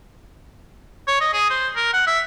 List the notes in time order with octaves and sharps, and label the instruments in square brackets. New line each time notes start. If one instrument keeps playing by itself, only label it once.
[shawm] C#5
D#5
G#4
C5
A#4
F#5
E5